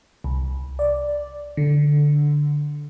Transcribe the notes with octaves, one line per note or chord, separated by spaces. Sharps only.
C2
D5
D3